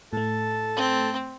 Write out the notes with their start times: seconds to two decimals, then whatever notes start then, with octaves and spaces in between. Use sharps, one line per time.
0.13 A2 A3 A4
0.75 C4